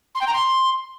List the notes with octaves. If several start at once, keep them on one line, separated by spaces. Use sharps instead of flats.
C6
G5
A#5
C6